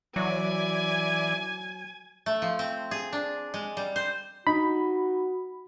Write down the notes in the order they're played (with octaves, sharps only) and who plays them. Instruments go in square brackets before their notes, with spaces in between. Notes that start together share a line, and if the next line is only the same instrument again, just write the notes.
[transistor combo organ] E3 D5 [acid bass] F#3 [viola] G#5
[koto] A3
F3
C4
G#4
D4
G#3
G3
C5
[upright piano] D#4 [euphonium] F#4 [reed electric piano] B5